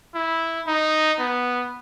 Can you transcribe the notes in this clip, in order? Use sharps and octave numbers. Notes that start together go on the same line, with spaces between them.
E4
D#4
B3